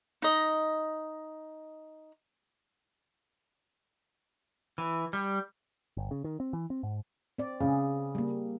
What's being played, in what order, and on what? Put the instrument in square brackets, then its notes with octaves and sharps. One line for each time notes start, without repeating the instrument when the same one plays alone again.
[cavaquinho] D#4 D#5
[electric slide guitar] E3
G3
[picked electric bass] G1
C#3
D#3
C4
E3
C4
G#2
[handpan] C4 D5
[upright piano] C#3 [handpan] G#4
[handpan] G3 A#3